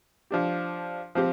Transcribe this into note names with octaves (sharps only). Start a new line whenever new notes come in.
F3 D4 G4
F3 C4 G4